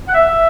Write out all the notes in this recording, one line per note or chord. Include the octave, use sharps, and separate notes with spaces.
F#5
E5